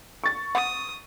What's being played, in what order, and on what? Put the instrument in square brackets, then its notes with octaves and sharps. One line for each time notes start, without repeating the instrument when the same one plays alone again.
[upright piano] C#6 A6
[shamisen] F#5 [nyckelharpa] D#6